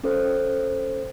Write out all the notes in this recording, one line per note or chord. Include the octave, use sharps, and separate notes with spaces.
C#4 A4 C5